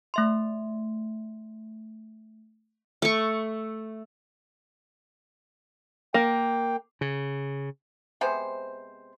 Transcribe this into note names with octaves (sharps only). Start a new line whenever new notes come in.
A3 E5 C6
A3 C#6
A#3 G5
C#3
C3 G#3 B3 C5